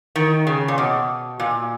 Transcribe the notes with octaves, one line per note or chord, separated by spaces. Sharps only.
D#3
C#3
A#2
B2
A#2